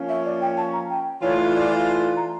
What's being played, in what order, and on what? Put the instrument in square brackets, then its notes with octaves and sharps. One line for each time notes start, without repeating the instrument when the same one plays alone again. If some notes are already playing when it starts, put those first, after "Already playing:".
Already playing: [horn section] F3 A#3 C#4
[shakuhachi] E5
D5
G5
A5
A#5
G5
[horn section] E3 A3 D4 F4 [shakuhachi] C#5
[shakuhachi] D5
A#5